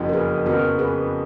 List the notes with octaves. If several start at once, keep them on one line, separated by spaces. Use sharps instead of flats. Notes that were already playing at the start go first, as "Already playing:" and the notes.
Already playing: F#1 F2 C#3 F3
A#4
G#4 B4
F2 C#3 F3 B3 F#4 A#4
G#4 B4